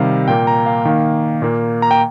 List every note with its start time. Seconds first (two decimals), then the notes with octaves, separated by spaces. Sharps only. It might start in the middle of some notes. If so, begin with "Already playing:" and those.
Already playing: C3 D#3 G3 F5
0.28 A#2 A#3 G5
0.47 A#5
0.66 F5
0.85 D#3 A#3
1.42 A#2 A#3
1.82 A#5
1.91 G5